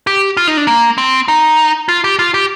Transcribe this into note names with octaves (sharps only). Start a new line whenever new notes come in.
G4
F4
D#4
D4
A#3
C4
D#4
F4
G4
F4
G4